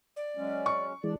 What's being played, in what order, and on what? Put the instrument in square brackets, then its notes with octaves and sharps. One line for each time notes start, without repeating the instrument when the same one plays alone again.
[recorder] D5
[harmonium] F#3 G#3 C#4
[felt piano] C#6
[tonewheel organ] E3 G#3 [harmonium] D4 D5